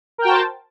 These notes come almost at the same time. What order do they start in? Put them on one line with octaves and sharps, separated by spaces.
A#4 G5 F#4 A5 C5